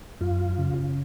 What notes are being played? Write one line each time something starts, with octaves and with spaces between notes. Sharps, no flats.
F#2 F4
C#3